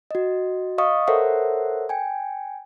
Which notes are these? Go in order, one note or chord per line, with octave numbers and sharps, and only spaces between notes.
F#4 D#5
D#5 F5 C#6 D#6
A4 A#4 C5 C#5 E5 F#5
G5 G#5